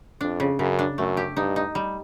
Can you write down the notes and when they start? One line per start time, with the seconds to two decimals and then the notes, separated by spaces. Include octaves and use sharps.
0.21 F2 D4
0.40 C#3
0.59 F#2 C#3
0.79 D4
0.98 F#2 A3
1.17 G4
1.37 G2 D#4
1.56 D#4
1.75 G3